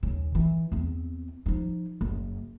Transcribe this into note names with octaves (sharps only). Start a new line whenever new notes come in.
D#2 C#3
E3
E2 C4
F3 D#4
F#1